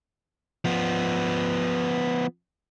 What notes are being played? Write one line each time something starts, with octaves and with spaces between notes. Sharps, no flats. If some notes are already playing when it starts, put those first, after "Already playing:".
F3 B3